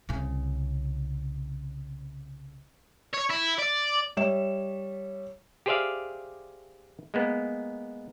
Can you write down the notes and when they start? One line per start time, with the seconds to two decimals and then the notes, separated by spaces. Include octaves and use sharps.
0.09 C2 C#3
3.13 C#5
3.30 E4
3.58 D5
4.17 G3 C#5 E5 E7
5.66 G4 G#4 C5 D5 E5 F5
7.14 G#3 A#3 B3